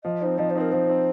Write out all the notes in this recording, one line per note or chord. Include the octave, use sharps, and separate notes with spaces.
F3 D#5
C4 D#4 C5
F3 D#5
C5
C4 D#4 A#4
F3 C5
C4 D#4